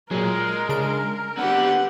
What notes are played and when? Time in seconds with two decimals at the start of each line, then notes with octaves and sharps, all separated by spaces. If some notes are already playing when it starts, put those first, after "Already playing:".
0.11 A#2 F#3 G#3 A#4
0.69 C#3 D4 D7
1.37 D3 B3 G4 F#5